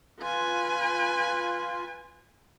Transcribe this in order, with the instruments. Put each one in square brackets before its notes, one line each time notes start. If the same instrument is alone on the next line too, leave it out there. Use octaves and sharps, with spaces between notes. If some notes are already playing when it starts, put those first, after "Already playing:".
[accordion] F4 [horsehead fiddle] B4 G#5